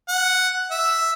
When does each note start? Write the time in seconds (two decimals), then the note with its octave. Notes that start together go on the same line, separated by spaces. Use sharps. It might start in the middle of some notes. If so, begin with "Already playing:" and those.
0.08 F#5
0.71 E5